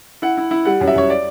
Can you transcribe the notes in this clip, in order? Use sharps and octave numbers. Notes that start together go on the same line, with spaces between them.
E4 F#5
E4
E4
G3 F#5
F#2
E5
F#2 C#5
D5